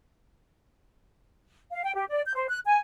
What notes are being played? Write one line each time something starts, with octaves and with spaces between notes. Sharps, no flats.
F5
G5
G4
D5
G6
C5
F#6
G#5